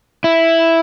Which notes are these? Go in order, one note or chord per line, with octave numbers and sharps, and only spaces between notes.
E4